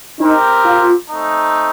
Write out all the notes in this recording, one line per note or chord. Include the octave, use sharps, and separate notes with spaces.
C4 D#4 G4 A#4
F4
A3 C4 D#4